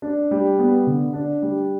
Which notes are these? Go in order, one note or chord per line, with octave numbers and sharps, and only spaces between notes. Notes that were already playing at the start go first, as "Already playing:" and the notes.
D4
G3
B3
D3
D4
G3